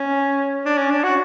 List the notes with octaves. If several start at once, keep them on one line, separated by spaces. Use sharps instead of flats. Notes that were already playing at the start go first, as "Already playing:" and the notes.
Already playing: C#4
D4
C#4
D4
F#4